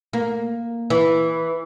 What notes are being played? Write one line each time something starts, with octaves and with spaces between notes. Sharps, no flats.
A#3
E3